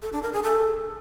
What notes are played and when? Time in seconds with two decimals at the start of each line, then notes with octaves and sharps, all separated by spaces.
0.02 A4
0.12 D4
0.23 A#4
0.33 G#4
0.43 A4